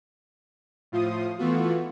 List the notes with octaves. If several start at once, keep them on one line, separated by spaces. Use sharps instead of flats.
A2 F3 F4 C6 D#6
E3 A3 B3 F4 F#4